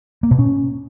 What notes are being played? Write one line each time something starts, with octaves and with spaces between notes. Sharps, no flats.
A#3
B2
C#4